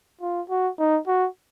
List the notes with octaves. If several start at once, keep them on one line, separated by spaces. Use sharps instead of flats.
F4
F#4
D#4
F#4